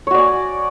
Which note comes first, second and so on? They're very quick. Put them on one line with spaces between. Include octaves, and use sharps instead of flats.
C#5 F#4 D5 G#5